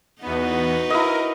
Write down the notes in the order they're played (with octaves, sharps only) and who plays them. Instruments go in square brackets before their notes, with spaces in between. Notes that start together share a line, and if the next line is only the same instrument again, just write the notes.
[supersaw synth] E2 B3 [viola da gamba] D#4 F#4 B4
[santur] E4 D#5 [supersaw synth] A#4